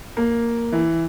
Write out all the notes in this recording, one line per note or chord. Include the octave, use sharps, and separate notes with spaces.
A#3
E3